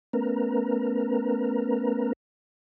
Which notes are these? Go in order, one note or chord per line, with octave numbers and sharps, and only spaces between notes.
A3 B3 C#4 A#4 B4 A#5